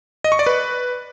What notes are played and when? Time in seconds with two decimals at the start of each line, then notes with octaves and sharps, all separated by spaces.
0.24 D#5
0.32 C#6
0.39 D5
0.46 B4